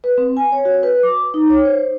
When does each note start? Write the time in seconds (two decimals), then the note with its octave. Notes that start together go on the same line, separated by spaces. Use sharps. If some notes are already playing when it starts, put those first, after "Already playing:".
0.04 B4
0.18 C4
0.37 G#5
0.52 C#5
0.65 F#4
0.83 B4
1.03 D6
1.34 D#4
1.50 C#5
1.65 C5